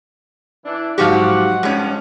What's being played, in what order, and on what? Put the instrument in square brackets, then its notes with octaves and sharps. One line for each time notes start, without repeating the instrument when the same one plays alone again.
[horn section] E3 D4
[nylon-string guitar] G#2 F#3 F5 [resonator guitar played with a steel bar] F3 F#4 G4 [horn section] F#5
[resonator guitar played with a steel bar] G2 F3 C#4 [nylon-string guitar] G#3